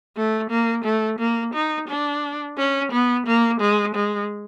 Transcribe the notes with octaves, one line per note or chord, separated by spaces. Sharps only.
A3
A#3
A3
A#3
D#4
D4
C#4
B3
A#3
G#3
G#3